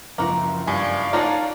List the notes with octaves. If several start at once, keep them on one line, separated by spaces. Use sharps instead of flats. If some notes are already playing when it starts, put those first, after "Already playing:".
F#1 C#2 F3 A#3 E4 F#4
G2 D5 F5 G#5
A#3 D4 D#4 F4 F#4 C#5